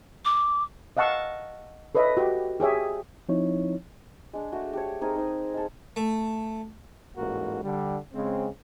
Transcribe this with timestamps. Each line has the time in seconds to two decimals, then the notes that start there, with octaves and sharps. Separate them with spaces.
0.25 D6
0.97 D#5 F5 F#5 A5 C#6 E6
1.95 A4 B4 C#5 D#5 E5 B5
2.17 F#4 G4
2.60 G4 G#4 C#5 E5
3.29 F3 C4 D#4 E4 C#5
4.33 G#3 D4
4.52 A3 F#4
4.73 G4 A4 C#5
5.01 C4 D#4 G#4 A#4
5.16 D#4 C5 D#5
5.54 G#3 A4
5.96 A3
7.16 A1 G#2 A#3 F#4 A#4
7.63 D3 G3
8.14 C#3 G#3 C4